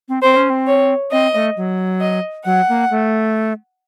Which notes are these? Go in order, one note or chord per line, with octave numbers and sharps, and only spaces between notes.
C4
C4 C5
C#4
C4
C#5
C4 D#5
A3
F#3
D#5
F#3 F#5
A#3
A3